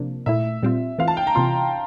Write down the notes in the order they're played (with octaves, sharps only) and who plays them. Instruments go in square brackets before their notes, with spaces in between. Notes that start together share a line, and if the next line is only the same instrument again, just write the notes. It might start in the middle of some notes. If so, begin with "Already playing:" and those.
Already playing: [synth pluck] C3 F3 A#3 D4
[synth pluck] A#2 A3 E4 [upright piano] E5
[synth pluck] A#2 G3 C4 F4
[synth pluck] E3 A3 C4 F4 [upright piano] F5
[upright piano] A5
G5
A#5
[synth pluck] C3 E3 A#3 F4 [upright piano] C6